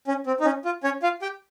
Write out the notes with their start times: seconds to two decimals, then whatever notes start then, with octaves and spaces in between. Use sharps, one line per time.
0.07 C#4
0.27 C4
0.40 D#4
0.45 C#4
0.65 F4
0.84 C#4 C#5
1.03 F4 F5
1.22 G4 G5